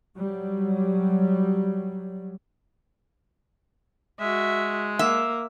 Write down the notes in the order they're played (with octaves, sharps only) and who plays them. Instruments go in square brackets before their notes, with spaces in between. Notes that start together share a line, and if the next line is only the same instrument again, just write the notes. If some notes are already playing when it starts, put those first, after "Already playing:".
[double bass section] F#3 G3
[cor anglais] G#3 [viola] F#4 E5
[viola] A#3 [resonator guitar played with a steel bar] E5